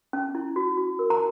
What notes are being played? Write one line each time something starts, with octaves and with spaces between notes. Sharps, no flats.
C#4
E4
F#4
F#4
A#4
A#5